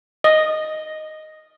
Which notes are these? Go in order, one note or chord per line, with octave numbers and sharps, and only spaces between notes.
D#5